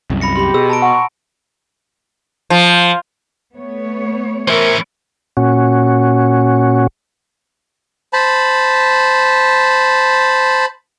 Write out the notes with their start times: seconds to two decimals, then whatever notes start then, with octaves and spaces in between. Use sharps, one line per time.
0.10 C2 F#2
0.21 B5 A#6 C#7
0.36 G4 B5 C6
0.54 B2 G#4 E6
0.70 A5 A#5 D7
0.82 F#5 C#6
2.50 F3
3.54 A3 B3 C#5
4.48 E3 C#4 A#4 C5 E5
5.37 A#2 C#4 F#4
8.13 C5 A5 B5